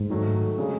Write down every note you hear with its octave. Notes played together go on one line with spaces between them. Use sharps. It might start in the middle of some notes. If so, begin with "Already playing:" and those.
Already playing: G#2
D#3 F#3 A3
C#3 G#3